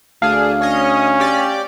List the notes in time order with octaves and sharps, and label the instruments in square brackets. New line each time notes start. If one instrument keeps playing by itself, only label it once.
[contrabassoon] D2 [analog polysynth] D4 G#4 [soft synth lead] F5
[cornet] C#4 [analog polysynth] C#5 D#5
[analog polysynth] G4 D5